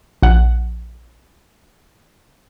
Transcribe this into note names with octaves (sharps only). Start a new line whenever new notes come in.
A#1 F#5